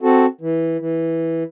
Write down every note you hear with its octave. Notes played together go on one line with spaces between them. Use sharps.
C4 F#4 A4
E3
E3